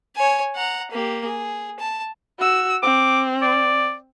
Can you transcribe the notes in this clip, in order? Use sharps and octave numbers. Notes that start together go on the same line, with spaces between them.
C#5 G#5
F#5 A#5
A#3 G4
G#4
A5
F#4 E6
C4 D6
D5